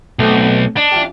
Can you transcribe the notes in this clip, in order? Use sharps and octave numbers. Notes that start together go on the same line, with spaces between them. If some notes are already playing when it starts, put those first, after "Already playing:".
B1 A3 C4
D4 D#5 A5
E3 F4 G4